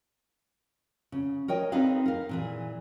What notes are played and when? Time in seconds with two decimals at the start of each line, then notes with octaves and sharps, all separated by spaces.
1.12 C#3
1.48 A#4 C#5 D#5 G5
1.72 C4 D#4 G#4 B4 F5
2.06 A#4 F5
2.29 A#2 E3 G#4